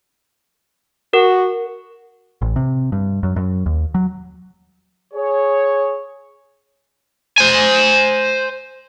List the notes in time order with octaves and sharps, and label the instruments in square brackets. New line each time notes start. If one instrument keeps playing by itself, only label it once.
[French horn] F#4 [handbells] A#4
[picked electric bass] A1
C3
G2
F#2
F#2
D#2
F#3
[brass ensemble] G#4 C#5
[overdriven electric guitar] C5 G#5